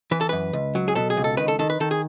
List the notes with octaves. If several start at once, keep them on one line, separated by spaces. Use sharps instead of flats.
E3 B4
A4
F#2 B4
C#2
F#3
G#4
B2 A4
G#4
C#2
A4
D#3 B4
A4
D#3 A4
B4
D#3 A4
G#4